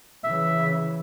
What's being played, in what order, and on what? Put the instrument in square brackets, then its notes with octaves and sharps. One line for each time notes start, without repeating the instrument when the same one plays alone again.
[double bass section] C#3 E3 [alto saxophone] E5